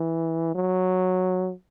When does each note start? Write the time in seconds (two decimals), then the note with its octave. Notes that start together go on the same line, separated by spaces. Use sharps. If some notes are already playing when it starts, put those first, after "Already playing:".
Already playing: E3
0.55 F#3